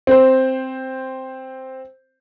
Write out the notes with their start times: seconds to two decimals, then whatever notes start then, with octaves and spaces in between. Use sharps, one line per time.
0.07 C4 C5